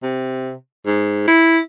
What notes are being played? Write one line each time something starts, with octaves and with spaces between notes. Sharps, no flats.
C3
G#2
E4